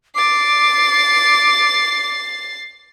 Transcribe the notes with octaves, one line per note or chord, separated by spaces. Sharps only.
D6 A6 C7